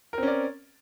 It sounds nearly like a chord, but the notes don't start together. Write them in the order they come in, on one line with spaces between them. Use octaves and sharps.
A#4 C4 C#4 D5